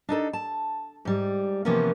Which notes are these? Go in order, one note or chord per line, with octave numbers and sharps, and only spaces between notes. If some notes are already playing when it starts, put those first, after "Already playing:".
D4 D#4 A4
A5
G#2 G3
C3 E3 F3 A#3 B3 C#4